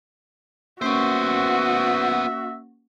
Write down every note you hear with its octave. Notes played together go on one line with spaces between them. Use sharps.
A#3 B3 C#4 F#4 C5 E5 C#6